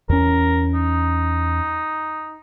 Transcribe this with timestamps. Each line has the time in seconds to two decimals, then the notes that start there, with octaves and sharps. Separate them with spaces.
0.09 E2 C#4 A#4
0.74 D#4